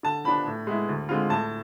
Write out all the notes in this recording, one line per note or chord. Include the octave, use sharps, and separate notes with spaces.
D3 A5
F3 B3 D4 B5
A2
G#3 B3 E4
D2
D3 G#3 C4 F4
A2 A5